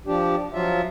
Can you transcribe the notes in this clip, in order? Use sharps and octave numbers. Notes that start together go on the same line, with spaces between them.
F3 D4 G4
F3 F#3 F4 E5